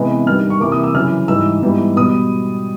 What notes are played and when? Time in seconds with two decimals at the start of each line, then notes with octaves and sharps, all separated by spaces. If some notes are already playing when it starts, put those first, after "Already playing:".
Already playing: C3 E3 G#3 B3
0.26 G2 D#3 G3 F6
0.50 C#6
0.60 C3 E3 G3 A#3 D6
0.72 D#6
0.83 E6
0.94 F#2 C#3 E3 F6
1.28 G#2 E3 G3 E6
1.62 G#2 E3 G3 B3
1.96 B2 G3 B3 D#6